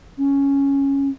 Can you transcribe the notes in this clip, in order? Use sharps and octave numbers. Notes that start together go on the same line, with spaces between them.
C#4